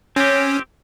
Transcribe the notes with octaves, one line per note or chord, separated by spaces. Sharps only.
C4 C#4 G4